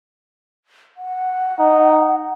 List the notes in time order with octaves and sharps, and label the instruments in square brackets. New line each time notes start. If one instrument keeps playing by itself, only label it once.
[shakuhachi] F#5
[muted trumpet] D#4